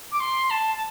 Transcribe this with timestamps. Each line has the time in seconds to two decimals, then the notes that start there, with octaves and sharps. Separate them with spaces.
0.11 D6
0.20 C6
0.50 A5
0.74 A5